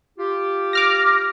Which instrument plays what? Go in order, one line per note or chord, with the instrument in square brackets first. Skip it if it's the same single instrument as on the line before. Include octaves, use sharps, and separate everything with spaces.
[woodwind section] F4 G4
[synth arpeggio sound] D6 F6 A#6